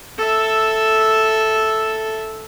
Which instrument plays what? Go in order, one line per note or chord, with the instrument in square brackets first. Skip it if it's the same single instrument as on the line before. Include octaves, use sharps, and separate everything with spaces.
[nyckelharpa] A4 E5